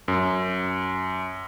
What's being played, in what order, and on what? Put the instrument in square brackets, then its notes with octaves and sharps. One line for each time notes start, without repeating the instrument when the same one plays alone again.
[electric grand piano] F#2